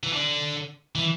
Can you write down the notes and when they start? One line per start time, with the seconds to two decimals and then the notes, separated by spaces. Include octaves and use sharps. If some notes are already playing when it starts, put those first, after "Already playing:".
0.03 E3
0.13 D3
0.95 E3